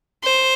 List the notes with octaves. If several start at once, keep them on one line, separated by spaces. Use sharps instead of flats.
C5